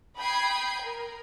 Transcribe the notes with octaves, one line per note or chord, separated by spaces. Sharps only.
G5 B5 D#6 G6 G#6 C7
A#4